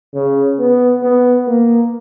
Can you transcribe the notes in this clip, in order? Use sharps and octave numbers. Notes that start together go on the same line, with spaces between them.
C#3
B3
B3
A#3